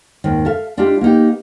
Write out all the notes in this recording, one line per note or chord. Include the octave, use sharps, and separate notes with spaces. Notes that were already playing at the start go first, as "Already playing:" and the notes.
D#2 G#2 D#3
A4 E5 F5
G#3 D4 E4 F4 G4
A#3 B3 D#4 G4